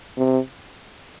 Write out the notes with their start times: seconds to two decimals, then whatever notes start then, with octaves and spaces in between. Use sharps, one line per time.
0.17 C3